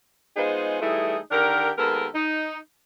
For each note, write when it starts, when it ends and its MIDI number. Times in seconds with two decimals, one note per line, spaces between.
0.37 0.78 56
0.37 0.78 59
0.37 0.78 63
0.37 0.78 65
0.37 0.78 68
0.37 0.78 72
0.81 1.17 52
0.81 1.17 55
0.81 1.17 57
0.81 1.17 63
0.81 1.17 64
0.81 1.17 68
1.31 1.70 50
1.31 1.70 51
1.31 1.70 62
1.31 1.70 67
1.31 1.70 70
1.78 2.07 39
1.78 2.07 56
1.78 2.07 59
1.78 2.07 69
1.78 2.07 70
2.14 2.57 63